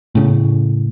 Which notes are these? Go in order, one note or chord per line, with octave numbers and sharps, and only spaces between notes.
A2 C#3